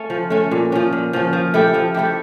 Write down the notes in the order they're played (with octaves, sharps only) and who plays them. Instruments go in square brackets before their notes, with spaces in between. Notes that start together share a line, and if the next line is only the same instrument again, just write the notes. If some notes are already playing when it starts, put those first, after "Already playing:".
Already playing: [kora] A3 C#4
F3
A3 C#4
A#2
F3 C#4
A#2
F3 C#4
F3
A3 E4 G4
F3
A3 E4 G4